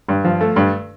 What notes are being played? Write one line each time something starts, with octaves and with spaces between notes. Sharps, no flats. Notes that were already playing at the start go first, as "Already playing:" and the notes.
G2
F3
A3
G2